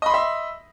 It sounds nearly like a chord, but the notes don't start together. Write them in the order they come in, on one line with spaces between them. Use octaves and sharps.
D#5 B5 C6 E5